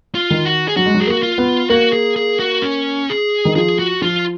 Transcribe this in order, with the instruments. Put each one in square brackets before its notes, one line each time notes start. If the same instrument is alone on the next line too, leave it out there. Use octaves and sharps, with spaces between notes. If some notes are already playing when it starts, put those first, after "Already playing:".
[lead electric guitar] F4
[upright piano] D#3
[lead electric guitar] F#4
G#4
[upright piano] F#3 [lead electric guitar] F#4
[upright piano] G#3
F#3
[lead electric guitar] G#4
[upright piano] A#3 [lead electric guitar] F#4
[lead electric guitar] F4
[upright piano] B3
[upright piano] A#3 [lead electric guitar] F#4
[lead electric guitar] G#4
G#4
F#4
C#4
G#4
[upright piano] D#3
[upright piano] F3 [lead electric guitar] G#4
[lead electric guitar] F#4
[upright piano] F3 [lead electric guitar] F4